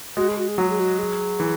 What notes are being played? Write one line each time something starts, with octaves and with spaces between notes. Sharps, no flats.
G#3 F#4
G#4
F#4
G#4
F#3 F#4
G#4
F#4
G#4
E3